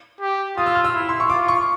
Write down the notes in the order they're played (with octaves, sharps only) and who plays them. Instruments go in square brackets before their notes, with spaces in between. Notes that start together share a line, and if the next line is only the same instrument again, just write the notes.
[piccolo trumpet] G4
[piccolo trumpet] F4 [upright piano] D#6
[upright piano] E6
F6
E6
[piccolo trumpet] E4
[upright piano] C6
C#6
[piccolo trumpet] F4 [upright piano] D6
[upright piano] C#6